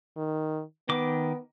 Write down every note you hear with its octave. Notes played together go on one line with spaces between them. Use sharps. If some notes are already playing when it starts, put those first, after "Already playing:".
D#3
D#3 B3 D6